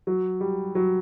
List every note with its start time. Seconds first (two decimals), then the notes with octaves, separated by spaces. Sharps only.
0.07 F#3
0.40 G3
0.75 F#3